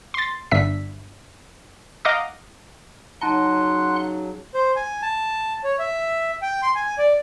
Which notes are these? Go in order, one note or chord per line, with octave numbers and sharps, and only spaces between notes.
C6 A6
G1 G2 D4 E5 B6
D#5 F5 F#5 A#5 D6 D#6
C#3 F#3 D#4 F#5 A5 A#5 C6 F#6
C5
G#5
A5
C#5
E5
G5
C6
G#5
D5